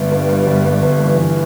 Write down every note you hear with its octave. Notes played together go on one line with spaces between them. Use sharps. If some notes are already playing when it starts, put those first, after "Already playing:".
Already playing: G1 G3
G2
G2
G1
G2
G1
G2 E3
G1